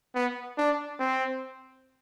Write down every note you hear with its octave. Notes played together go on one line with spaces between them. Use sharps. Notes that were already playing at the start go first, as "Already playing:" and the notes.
B3
D4
C4